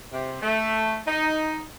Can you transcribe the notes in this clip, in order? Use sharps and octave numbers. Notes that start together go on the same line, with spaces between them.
C3
A3
D#4